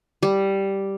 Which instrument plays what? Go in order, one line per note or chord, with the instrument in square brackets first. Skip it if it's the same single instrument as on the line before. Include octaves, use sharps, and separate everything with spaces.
[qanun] G3